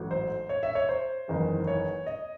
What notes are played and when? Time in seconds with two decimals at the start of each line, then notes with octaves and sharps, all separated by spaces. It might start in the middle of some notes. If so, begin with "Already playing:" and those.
Already playing: A1 G#2 F#3 A3
0.11 C5
0.49 C#5
0.63 E5
0.75 C#5
0.89 C5
1.28 F#1 E2 D#3 G#3
1.67 C#5
2.06 D#5